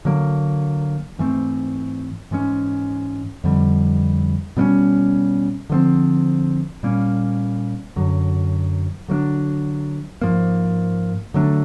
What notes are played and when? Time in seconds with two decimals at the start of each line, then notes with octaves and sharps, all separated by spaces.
0.05 D3 F#3 A#3
1.19 G#2 E3 A3 C4
2.31 G#2 E3 G#3 C#4
3.44 F2 D3 G3
4.57 B2 G3 A#3 C#4
5.70 D3 F3 A3 C4
6.83 A#2 G3 A#3 C#4
7.96 F#2 D3 F#3
9.08 D3 F#3 A#3 D4
10.22 G#2 F3 A#3
11.34 D3 F#3 A3 D4